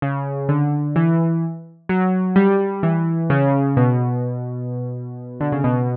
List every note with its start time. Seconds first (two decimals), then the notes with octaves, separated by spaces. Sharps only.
0.02 C#3
0.49 D3
0.96 E3
1.89 F#3
2.36 G3
2.83 E3
3.30 C#3
3.77 B2
5.41 D3
5.52 C#3
5.64 B2